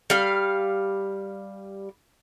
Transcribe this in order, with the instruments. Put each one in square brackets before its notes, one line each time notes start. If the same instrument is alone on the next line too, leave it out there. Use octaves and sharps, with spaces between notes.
[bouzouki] G3 F5